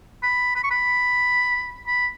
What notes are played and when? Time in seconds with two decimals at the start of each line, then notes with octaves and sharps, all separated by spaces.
0.23 B5
0.56 B5
0.64 C#6
0.71 B5
1.87 B5